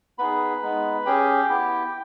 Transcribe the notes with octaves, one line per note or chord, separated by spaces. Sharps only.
B3 D#4 G#4 B4 B5
G#3 B3 D#4
C#4 G4 G#4 G5
B3 E4 G4